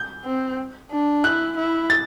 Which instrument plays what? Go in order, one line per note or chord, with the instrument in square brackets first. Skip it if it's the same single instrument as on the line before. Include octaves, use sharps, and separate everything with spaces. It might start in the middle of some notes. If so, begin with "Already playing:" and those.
Already playing: [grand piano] G6
[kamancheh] C4
D4
[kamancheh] E4 [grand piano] F#6
[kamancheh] E4
[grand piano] A6